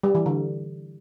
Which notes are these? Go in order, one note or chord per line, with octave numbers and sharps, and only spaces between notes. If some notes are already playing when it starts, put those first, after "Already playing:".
G3
E3
D3